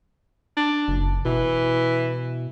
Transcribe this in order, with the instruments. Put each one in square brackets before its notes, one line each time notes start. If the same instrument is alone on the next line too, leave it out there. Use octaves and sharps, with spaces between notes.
[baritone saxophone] D4
[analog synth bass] F#1
[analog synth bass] B2 [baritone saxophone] E3